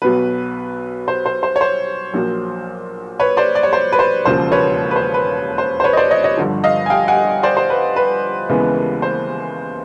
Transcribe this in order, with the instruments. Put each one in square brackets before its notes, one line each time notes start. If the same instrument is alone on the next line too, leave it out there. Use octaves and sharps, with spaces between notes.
[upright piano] B1 B2 F#3 B4
C5
C5
C5
C#5
C5
A#1 A#2 F#3
B4 C#5
C5 D5
D5
C#5
C5
B4
C5
E1 D#2 C#3 F3 C5
B4 C#5
B4
C5
B4
C5
C5
B4 C#5
D#5
C5 D5
C#5 D#5
C#5 D#5
G1 G2 D3 F3
D#5 F5
G#5
F5 G5
F#5 G#5
C5 D5
C5
B4
B4
D#2 C#3 E3 G#3 B3
C5